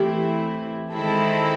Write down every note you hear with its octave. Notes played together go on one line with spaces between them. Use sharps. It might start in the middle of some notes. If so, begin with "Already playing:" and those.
Already playing: E3 A3 C4 E4 G4
D#3 G#3 C4 E4 A4